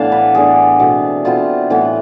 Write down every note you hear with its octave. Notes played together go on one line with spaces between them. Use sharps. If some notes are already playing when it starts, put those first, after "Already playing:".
Already playing: A2 E3 B3 D4 F5 A5
B4
A2 E3 B3 D4 G#4
B2 A3 C4 E4
B2 A3 C4 E4 F4
A2 E3 B3